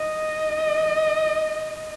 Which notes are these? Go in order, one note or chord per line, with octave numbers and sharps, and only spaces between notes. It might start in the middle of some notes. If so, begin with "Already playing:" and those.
Already playing: D#5